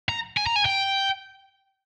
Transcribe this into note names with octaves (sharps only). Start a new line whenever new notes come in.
A#5
G#5
A#5
G#5
G5